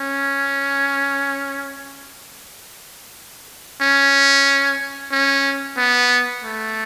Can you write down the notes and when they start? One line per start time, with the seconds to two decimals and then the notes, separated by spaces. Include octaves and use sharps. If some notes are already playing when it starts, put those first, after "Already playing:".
Already playing: C#4
3.81 C#4
5.12 C#4
5.77 B3
6.42 A3